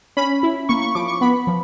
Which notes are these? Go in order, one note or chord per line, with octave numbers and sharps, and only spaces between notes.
C#4 B5
E4
A#3 C#6
C#6
F3 D6
C#6
B3 B5
F3